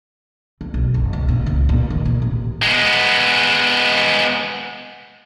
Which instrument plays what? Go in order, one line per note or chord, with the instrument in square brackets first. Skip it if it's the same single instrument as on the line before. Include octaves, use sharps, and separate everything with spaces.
[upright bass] E3
B1
F#1
C#2
A#2
C#2
A#2
D#3
A#2
A1
[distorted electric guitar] G#3 B3